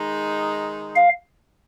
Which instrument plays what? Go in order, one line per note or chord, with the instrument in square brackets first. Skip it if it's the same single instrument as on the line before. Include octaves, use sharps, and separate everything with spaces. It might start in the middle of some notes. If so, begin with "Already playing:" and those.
Already playing: [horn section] D#3 G#3 D#4
[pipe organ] F5